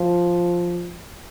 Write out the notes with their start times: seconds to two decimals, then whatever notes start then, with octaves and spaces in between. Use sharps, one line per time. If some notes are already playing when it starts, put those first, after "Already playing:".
Already playing: F3